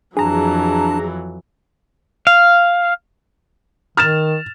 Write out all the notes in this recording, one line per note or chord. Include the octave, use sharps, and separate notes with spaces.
F2 E3 F#3 D4 G#4 A5 A#5
F5
D#3 F6 A6 E7